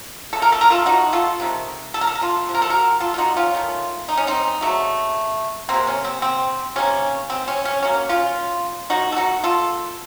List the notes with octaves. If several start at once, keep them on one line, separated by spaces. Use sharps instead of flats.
C#3 A3 A4
A#4
A4
A#4
F4 A4
D#4 F#4
F4 A4
C3 D#3 A3
A4
A#4
A4
A#4
F4 A4
C3 F3 A3
A#4
A4
F#4 A#4
F4 A4
F4
D#4 F#4
C#4 F4
D#3 A3
D#4
C#4
C4 D#4
C#3 F#3 A3
C3 D#3 A#3 C4
C#4
C4
C4
C3 D#3 A#3 C#4
C4
C#4
C#4
D#3 F#3 A#3 C#4
C#4 F4
D#3 A#3 D#4 F#4
A4
D#4 F#4
F4 A4